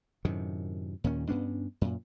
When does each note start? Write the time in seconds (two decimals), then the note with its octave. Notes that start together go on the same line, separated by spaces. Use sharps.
0.25 F#2 A2 C3 D#3
1.04 D#2 A#2 D#3 C#4
1.28 G2 B3 C#4 D4
1.81 F#2 A#2